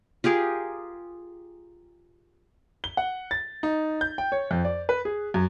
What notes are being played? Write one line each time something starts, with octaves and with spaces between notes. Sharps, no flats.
F4 G4 G#4 A#4
G7
F#5
A6
D#4
G6
G5
C#5
F2
D5
B4
G#4
F#2